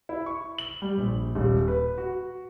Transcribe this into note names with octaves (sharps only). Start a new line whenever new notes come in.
E4
C#6
F#7
G3
A#1
D#1
B4
F#4